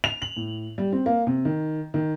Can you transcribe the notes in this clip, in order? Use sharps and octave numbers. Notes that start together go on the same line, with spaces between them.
F7
F#7
A2
G3
C4
A#3
C3
D#3
D#3